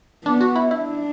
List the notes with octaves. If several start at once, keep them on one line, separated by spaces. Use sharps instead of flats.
B3 D4
F#4
E4
D4 E4